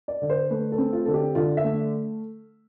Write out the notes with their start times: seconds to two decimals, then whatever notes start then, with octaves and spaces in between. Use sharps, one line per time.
0.08 D5
0.22 D3
0.30 C5
0.50 A3 B4
0.72 A4
0.78 C4
0.93 F4
1.05 D3 A4
1.14 G4
1.35 D3 F4
1.57 E5
1.64 A3